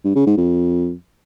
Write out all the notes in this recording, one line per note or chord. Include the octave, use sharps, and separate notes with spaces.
G2
C#3
G#2
F2